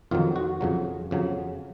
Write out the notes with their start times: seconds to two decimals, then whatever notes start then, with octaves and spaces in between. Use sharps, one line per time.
0.11 F2 D#3 F#3 F4
0.36 F#4
0.61 F2 C#3 F#3
1.11 F2 C#3 F#3